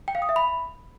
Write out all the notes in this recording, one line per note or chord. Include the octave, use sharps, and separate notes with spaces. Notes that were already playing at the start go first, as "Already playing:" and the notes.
G5
F5
D#6
E5
B5